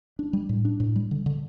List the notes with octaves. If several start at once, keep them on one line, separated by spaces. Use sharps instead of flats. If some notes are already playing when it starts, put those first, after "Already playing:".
D4
G3
A2
D4
A2
G3
D3
D3